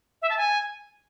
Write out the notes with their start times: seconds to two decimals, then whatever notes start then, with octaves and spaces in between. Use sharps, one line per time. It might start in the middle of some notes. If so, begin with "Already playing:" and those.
0.22 E5
0.30 A5
0.37 G#5